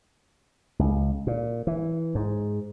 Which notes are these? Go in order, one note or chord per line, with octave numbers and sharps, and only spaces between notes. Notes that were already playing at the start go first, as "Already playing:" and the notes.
C#2
A#2
E3
G#2